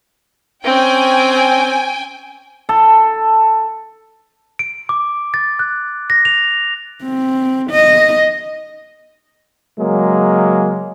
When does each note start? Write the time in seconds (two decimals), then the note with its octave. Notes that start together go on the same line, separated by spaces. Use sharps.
0.65 C4 C#4 G5 G#5
2.69 A4
4.59 D7
4.89 D6
5.34 A6
5.59 F#6
6.10 A#6
6.25 F7
7.03 C4
7.71 D#5
9.78 C#3 F#3 G#3 A#3